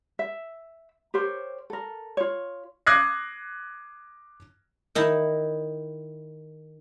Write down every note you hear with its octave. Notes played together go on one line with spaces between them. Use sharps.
E5
G4 A#4 C5 C#5
A4 A#4
F4 C#5
D6 D#6 F#6 G#6 A#6 C7
D#3 D#4 E4